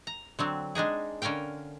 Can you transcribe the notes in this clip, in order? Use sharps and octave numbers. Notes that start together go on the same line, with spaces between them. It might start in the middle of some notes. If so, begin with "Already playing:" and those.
A#5
D3 F#3 C4
G#3 D4 D#4 G#4
D3 C#4 A#4 F5 G5